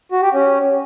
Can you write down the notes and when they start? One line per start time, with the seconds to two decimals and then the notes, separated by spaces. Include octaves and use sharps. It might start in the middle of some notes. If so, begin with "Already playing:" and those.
0.12 F#4
0.23 G4
0.34 C#4